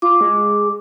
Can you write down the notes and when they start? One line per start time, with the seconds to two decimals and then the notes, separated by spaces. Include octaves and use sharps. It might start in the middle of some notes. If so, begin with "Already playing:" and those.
0.02 F4 D6
0.21 G#3